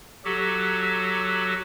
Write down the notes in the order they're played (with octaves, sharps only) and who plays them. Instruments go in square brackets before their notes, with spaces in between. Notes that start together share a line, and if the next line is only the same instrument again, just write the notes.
[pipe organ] F#3 F#4 G4 A4